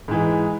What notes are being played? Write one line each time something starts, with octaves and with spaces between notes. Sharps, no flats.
G#2 E3 G#3